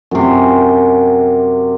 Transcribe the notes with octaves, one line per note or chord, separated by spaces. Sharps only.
F#2 C3